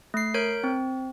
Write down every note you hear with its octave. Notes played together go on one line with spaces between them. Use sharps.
A3 C7
A#4 C#5 G6 D7
C4